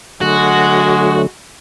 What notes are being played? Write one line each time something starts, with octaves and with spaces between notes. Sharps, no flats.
D3 F#3 G#3 A3 F#4